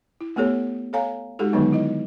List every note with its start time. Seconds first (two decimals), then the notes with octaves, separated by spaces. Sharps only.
0.21 E4
0.36 A3 B3 G4 A4 C#5
0.93 A4 C#5 F5 G#5 A#5
1.39 G#3 D#4 F#4 G4 A4
1.53 D3 D#3 F#3 G#3 B3 D#4
1.73 E4 D#5